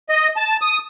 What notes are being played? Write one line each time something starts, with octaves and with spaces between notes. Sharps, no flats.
D#5
A5
D#6